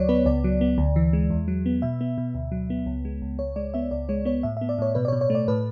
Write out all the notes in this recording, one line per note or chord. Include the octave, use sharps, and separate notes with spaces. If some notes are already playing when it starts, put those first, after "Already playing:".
Already playing: D2 F#3 C#5 D5
B3 B4
C#2 D5
F#3
B3
D2
E3
G#3
E2
F#3
B3
B2 E5
B3
B2
D2
F#3
B3
C#2
G#3
C#2
C#2 C#5
G#3 D5
B3 E5
C#2 D5
G#3 C#5
B3 C#5
A2 E5
E5
B3
D5
A2 C#5
B2 B4
D5
C#5
B2
C#5
A3
D5
A2 B4